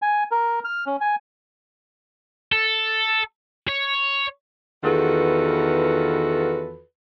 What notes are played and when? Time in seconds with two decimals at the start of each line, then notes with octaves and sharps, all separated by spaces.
0.02 G#5
0.31 A#4
0.65 F6
0.86 C#4
1.01 G#5
2.52 A4
3.68 C#5
4.84 E2 D#3 F4 F#4 A4 B4